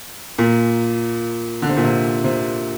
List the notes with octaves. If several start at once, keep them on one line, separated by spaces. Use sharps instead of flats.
A#2
D3
C3
A#2
C3
C3